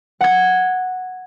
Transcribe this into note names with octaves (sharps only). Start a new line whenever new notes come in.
F#5 G#6